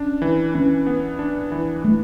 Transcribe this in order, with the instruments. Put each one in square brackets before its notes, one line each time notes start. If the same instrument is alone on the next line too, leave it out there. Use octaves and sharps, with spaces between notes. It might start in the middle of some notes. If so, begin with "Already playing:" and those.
Already playing: [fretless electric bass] C#4 [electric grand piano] D4
[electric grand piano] E3
[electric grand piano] E3 [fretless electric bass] C#4
[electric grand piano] B3
D4
E3
[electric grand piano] E3 [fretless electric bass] A3